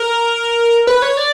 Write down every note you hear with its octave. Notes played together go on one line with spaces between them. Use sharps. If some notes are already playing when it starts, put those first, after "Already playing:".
Already playing: A#4
B4
C#5
D5